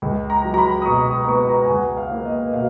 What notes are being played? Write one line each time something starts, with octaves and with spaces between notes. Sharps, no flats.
C#2
A#5
F#3
A#5
B5
D#6
B2 C#6
D#6
B3 C#6
A#5
G#5
C#2 F#5
F5
A#3
D#5
B2 F5